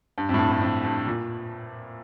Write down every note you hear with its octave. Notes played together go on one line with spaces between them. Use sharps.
G2
F2
A2
G2
G2
F2
G2
A#2